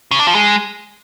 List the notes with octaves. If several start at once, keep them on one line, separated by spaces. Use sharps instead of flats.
C#3
D4
F3
G#3